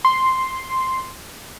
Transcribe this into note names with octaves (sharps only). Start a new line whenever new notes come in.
C6